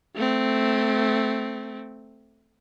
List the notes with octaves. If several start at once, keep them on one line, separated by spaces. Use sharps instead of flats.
A3 C4